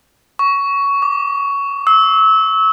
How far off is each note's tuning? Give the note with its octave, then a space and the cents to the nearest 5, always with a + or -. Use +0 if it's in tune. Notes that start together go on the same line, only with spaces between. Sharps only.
C#6 +15
D6 -25
E6 -25